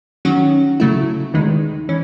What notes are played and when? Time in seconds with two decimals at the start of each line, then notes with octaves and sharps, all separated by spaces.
0.25 D#3 F#3 C#4 F#4
0.80 C#3 F#3 A3 E4
1.34 E2 D#3 G#3 D#4
1.89 E3 C#4